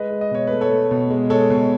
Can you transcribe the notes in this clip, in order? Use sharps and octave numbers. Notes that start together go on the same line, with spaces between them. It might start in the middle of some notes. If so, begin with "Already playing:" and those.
Already playing: G#3 B4 D#5
G#3
D#5
B2 C#5
A3 B4
A4 C#5
A3
B2
G#3
G#3 A4 C#5
B2